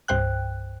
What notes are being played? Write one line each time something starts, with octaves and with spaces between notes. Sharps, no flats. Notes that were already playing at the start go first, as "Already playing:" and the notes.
C2 G2 C5 G5 F#6